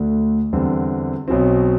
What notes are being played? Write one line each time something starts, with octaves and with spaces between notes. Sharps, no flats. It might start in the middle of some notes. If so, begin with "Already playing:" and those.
Already playing: D2 D3 A3
E2 D3 G3 C4
B1 B2 F#3 C4